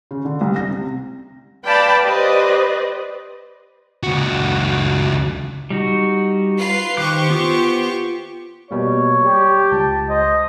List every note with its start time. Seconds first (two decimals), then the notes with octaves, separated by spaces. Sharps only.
0.11 C#3
0.25 D3
0.41 C2
0.56 A#6
0.71 C3
1.66 B4 D5 F5 G5 A5 B5
2.03 G4 B4 C5 D5 D#5
4.03 C#2 F#4
5.70 G3 D#4 F#4
6.58 F4 B4 C7
6.97 D#3 G4 C5 C#6 D6 F#6
7.30 B3 F4 D#6
8.71 B2 G3 A#3 C#5
9.24 G3 G4
9.72 C#2 A5
10.10 C5 D#5